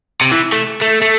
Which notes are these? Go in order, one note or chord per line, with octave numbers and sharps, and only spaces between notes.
C3
E3
A3
A3
A3